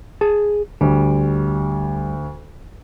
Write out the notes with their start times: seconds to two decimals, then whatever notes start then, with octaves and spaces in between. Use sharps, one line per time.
0.21 G#4 A5
0.81 D2 G3